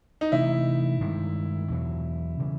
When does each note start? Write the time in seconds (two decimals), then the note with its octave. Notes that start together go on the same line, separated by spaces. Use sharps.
0.21 D#4
0.32 C3 E3 A3 E4
1.01 G2 D#3 G#3
1.70 E2 B2 F#3
2.40 C#3 E3 G3